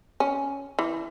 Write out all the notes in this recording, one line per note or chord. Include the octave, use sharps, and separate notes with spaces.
C#4
E3